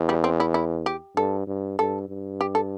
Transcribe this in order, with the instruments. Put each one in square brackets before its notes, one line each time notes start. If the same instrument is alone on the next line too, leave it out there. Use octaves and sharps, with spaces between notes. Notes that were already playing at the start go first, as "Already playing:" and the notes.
Already playing: [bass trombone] E2
[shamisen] G3
C4
E4
E4
G4
[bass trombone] G2 [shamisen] A4
[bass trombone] G2
[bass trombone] G2 [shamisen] A4
[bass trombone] G2
[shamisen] G4
A4